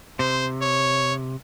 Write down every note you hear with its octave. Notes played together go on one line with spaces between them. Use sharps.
C3 C5
C#5